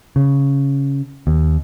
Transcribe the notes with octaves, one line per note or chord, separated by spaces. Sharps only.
C#3
D#2